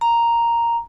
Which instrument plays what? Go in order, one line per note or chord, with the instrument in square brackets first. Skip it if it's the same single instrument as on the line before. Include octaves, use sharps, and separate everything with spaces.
[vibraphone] A#5